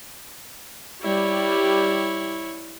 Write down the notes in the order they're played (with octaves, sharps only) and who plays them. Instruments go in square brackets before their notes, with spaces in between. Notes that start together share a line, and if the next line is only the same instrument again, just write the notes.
[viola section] G3 [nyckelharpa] E4 C#5